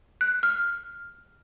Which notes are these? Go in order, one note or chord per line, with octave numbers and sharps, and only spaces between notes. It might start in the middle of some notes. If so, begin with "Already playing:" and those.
F#6
F6